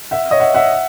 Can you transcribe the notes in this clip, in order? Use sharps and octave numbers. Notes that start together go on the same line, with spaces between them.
E5 F#5
C#5 D#5
E5 F#5
E5 F#5